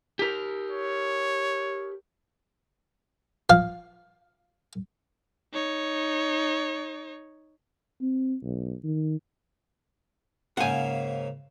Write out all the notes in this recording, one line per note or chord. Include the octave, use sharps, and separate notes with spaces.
G4 A#4
C#5
F3 F5
D#4 C#5
C4
B1
D#3
G#2 C#3 A#3 F#5 G#5